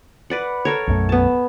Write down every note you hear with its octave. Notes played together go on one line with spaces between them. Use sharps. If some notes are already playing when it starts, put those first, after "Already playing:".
B4 D5 F#5
A4 A#4 C#5
B1 F#2 A3
B3 A5